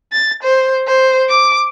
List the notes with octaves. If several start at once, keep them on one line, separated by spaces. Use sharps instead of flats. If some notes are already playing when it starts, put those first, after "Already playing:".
A6
C5
C5
D6